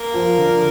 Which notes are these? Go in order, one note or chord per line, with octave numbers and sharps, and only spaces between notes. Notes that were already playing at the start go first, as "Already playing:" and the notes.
Already playing: A#3 A#4
F3
D3